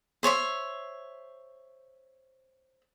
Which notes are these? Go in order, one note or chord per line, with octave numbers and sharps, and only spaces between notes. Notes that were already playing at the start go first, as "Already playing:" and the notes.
C5 C#5 D#5 E5